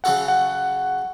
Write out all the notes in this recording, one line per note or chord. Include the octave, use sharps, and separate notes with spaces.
C#3 F#3 C#4 F#4 A4 F#5
F#5